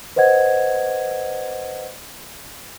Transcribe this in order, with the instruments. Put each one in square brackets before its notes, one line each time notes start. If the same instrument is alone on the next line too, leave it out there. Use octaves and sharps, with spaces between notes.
[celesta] B4 C5 D#5 F#5 G#6